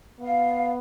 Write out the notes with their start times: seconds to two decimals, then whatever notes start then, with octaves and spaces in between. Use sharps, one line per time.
0.20 B3 F5